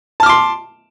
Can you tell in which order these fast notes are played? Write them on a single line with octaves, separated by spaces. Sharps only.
A5 F6 D6 C6